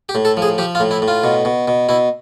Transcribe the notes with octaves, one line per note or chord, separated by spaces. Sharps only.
G4
A2
A4
F3
G#4
F3 G4
F4
A2
E4
A2
F4
B2
B2
B2
B2 E4